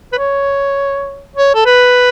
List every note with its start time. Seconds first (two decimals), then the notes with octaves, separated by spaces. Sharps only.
0.13 B4
0.18 C#5
1.36 C#5
1.55 A4
1.65 B4